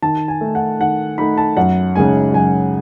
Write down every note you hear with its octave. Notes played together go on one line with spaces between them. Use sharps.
D#3 A5
G#5
A3 D#4
F#5
D#3 F#5
A3 D#4 B5
A5
F#2 F#5
C#3 G#3 D#4 G#5
F#2 G#5